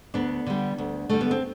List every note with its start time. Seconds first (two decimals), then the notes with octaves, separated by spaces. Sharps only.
0.14 D2 B3 D4
0.46 D3 G3
0.78 D2
1.09 D3 G3 A3
1.21 B3
1.31 C4